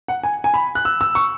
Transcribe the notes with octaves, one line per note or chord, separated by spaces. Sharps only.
F#5
G#5
G#5
B5
F#6
E6
E6
C#6